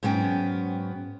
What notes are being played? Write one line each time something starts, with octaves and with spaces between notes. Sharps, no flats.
G#2 F#3 B3 C#4 G5